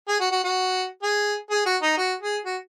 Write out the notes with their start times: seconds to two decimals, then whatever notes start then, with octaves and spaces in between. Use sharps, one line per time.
0.08 G#4
0.20 F#4
0.32 F#4
0.44 F#4
1.03 G#4
1.51 G#4
1.66 F#4
1.82 D#4
1.98 F#4
2.21 G#4
2.46 F#4